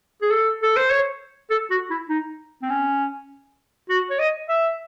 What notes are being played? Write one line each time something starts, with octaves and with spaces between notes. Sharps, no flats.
G#4
A4
A4
C5
C#5
A4
F#4
E4
D#4
C4
C#4
F#4
C#5
D#5
E5